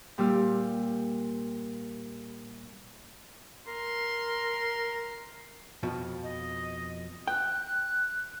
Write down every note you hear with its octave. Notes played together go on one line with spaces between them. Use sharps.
A#2 G3 G4 F5 E6
A#4 C6
F2 B2 F3
D#5
G5 F#6